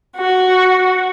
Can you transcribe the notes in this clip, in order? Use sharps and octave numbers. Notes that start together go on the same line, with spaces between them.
F#4